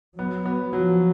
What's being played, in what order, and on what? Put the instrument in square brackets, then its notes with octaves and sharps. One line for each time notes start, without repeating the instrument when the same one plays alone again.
[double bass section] F#3 [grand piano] B3
[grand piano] B3
[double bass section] F3 [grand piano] F#3